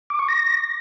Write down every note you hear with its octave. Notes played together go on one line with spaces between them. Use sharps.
D6
C#6
A#6